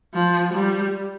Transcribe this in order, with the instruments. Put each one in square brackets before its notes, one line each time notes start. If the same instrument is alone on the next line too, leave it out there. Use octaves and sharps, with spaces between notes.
[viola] F3
G3